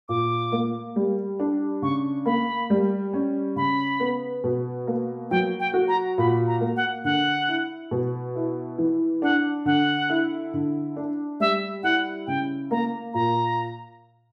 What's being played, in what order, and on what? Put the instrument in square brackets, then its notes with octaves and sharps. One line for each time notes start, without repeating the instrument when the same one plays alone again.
[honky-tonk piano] A#2 [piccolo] D6
[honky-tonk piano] A#3
G3
D4
[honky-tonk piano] C#3 [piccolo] C#6
[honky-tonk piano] A#3 [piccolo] B5
[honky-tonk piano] G3
C#4
[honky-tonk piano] C#3 [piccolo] B5
[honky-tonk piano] B3
B2
A#3
[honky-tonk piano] F#3 [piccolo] G5
[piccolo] G5
[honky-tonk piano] F#4
[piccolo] A#5
[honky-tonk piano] A#2 [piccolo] B5
[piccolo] A#5
[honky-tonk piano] A#3
[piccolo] F#5
[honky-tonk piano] D3 [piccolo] F#5
[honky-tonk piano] E4
B2
E4
E3
[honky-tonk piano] D4 [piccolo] F#5
[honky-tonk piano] D3 [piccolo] F#5
[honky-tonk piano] E4
D3
D4
[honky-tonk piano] G3 [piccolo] E5
[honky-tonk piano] E4 [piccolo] F#5
[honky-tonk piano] C#3 [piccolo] G5
[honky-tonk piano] A#3 [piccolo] A#5
[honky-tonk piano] A#2 [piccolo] A#5